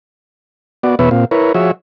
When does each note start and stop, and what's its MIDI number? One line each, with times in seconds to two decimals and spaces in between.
0.83 0.95 59
0.83 0.95 66
0.83 0.95 74
0.99 1.09 40
0.99 1.09 47
0.99 1.09 59
0.99 1.09 71
0.99 1.09 73
0.99 1.09 76
1.11 1.25 46
1.11 1.25 60
1.11 1.25 65
1.31 1.52 64
1.31 1.52 70
1.31 1.52 71
1.31 1.52 73
1.54 1.71 53
1.54 1.71 66
1.54 1.71 68
1.54 1.71 73
1.54 1.71 76